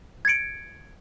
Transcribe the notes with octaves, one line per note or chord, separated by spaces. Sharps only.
G#6 A6 C#7 D7